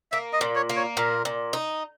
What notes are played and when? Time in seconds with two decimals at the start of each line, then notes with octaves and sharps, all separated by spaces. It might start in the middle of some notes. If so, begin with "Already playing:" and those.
0.12 A#3 E5
0.33 D#5
0.41 A#2
0.55 C#5
0.70 A#3
0.76 C#5
0.97 A#2 A#4
1.25 A#2
1.53 D#4